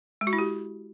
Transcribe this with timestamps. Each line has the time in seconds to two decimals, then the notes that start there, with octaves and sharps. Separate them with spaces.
0.21 G#3
0.27 F#4
0.33 E4
0.39 G4